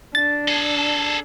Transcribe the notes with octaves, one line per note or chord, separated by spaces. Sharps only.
D4 A6
G#4 A4